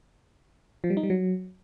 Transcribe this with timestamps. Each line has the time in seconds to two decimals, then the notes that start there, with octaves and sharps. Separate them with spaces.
0.84 F3
0.90 G3
0.97 D#4
1.03 G3
1.10 F#3